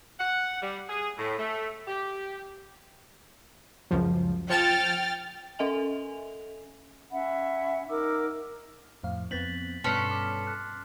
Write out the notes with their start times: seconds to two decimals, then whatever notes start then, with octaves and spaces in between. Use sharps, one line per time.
0.20 F#5
0.62 G3
0.90 G#4
1.17 A2
1.38 A3
1.88 G4
3.91 C#2 F#2 F3
4.50 F3 G5 F6 A6 C#7 E7
5.59 C#4 A4 D#5 E5 G#5 F7
7.12 C#4 E5 F#5 B5
7.89 D#4 A#4 D6 E6
9.03 F2 A2 F5
9.31 F2 B3 C4 A6 B6 F#7
9.84 G2 B2 C#4 A4 B4 C6 F6 C7
10.11 D6
10.47 F#6